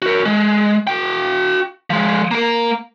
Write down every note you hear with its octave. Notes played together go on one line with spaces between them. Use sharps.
F#4 A#4
G#3
F#4 G5
F3 G#3
A#3 A#4